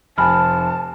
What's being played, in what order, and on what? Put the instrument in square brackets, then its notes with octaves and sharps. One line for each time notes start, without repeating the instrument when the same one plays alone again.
[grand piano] F1 [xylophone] G#5 B5 F6 [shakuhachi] A5